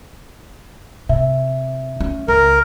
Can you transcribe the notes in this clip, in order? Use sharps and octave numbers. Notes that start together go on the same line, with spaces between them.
C3 E5
C#4
C#2 A#4